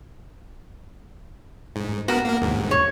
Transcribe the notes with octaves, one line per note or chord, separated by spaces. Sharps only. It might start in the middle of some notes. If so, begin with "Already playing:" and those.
G#2
B3 F#4 A#4
A#3 A#4
D#2 G#2
C#5